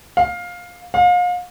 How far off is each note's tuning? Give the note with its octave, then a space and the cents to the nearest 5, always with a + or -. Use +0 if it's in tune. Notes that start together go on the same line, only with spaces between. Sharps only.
F5 +15
F5 +35